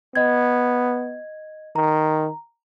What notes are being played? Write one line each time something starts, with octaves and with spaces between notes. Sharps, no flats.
B3 D#5 G#6
D#3 A#5